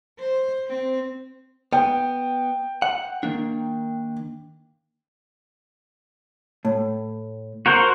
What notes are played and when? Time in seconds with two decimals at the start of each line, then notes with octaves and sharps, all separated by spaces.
0.19 C5
0.67 C4
1.73 B3 G5
2.82 F#5
3.23 D#3 A#3 D4
6.65 A2
7.66 F#4 A#4 C5